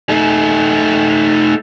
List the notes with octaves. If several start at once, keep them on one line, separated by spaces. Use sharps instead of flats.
A3 D#4